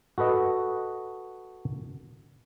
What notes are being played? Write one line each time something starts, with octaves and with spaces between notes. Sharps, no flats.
F#4 A4 B4 D#5 F#5